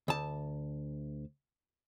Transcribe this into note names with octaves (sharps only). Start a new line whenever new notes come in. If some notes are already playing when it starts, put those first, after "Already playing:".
D2 A5